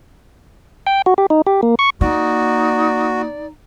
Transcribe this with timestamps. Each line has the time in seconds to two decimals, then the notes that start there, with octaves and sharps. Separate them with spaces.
0.87 G5
1.06 F#4
1.18 G4
1.30 D#4
1.47 G4
1.63 A#3
1.79 C#6
2.01 A#3 D#4 F#4 D5